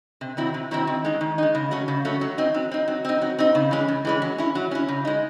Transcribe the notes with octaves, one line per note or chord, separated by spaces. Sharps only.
C3
D#3 F#3 C4 E4
C3
D#3 F#3 C4 E4
D#3
G#3 D#4
D#3
G#3 D#4
C#3
F#3 A3 C#4
C#3
F#3 A3 C#4
F#3
C4 D#4
F#3
C4 D#4
F#3
C4 D#4
F#3
C4 D#4
C#3
E3 G#3 C#4
C#3
E3 G#3 C#4
F#3
C#4 E4
F#3
C#4 E4
C#3
G#3 D#4